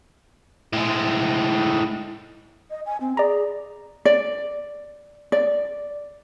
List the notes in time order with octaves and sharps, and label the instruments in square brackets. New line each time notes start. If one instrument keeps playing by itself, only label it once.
[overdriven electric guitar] A2 G#3
[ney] D#5
G#5
C4
[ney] G#4 [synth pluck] D5 A#5
[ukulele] D5
D5